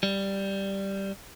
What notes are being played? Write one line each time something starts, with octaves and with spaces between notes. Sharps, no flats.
G3